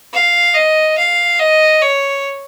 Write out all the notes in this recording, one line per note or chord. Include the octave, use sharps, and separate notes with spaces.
F5
D#5
F5
D#5
C#5